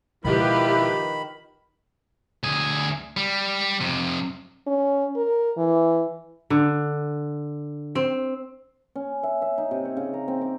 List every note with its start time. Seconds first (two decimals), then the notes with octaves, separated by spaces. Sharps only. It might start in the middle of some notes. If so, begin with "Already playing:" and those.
0.25 B2 D#3 F3 G#3 E4 G4 B4 B5
2.43 D2 G#4
3.17 G3
3.81 F2 C3
4.67 C#4
5.16 A#4
5.57 E3
6.50 D3
7.95 C4
8.95 C#4
9.23 E5
9.42 E5
9.58 D#4
9.71 C3
9.85 C#5
9.97 C#3
10.14 A#5
10.28 C4
10.41 D6